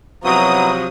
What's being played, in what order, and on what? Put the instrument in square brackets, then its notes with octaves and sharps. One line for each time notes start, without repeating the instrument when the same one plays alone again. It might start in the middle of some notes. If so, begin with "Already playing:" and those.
[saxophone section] C3 F3 F#3 [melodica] B3 E4 F#4 [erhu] A#5 [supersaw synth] D#6